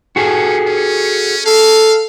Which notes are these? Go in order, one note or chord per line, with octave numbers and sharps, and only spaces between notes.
C#4 F#4 G#4 A4
C#4
A4 F5